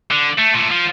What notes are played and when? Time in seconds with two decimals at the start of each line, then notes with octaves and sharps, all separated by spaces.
0.11 D3
0.39 A3
0.54 A#2 A3
0.71 F3